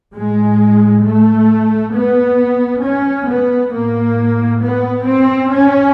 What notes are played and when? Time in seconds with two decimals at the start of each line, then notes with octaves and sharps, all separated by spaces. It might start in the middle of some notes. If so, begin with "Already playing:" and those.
0.14 A2 G#3
1.04 A3
1.94 B3
2.83 C#4
3.28 B3
3.72 A2 A#3
4.62 B3
5.06 C4
5.52 C#4